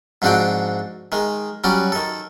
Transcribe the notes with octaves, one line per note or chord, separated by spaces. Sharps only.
G#2 F3 C4 D4 F#4 G5
D#3 G#3
F#3 G3 C#4 D5
D#3 A4